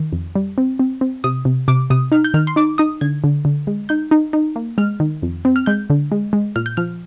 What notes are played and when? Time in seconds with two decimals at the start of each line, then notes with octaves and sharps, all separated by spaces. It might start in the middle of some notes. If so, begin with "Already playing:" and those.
Already playing: D#3
0.13 F2
0.35 G3
0.58 C4
0.79 C4
1.01 C4
1.24 C3 D#6
1.45 C3
1.68 C3 D6
1.90 C3 D#6
2.12 D#4 F6
2.24 G6
2.34 D#3 F6
2.47 C6
2.56 D#4 D6
2.78 D#4 D#6
3.01 D3 G#6
3.24 D3
3.45 D3
3.67 G#3
3.89 D#4 G6
4.11 D#4
4.33 D#4
4.56 A#3
4.78 G#3 F6
5.00 D#3
5.22 F2
5.45 C4
5.56 F6
5.66 G#3 G6
5.90 D3
6.12 G#3
6.33 G#3
6.56 A#2 F6
6.66 G6
6.77 F3 F6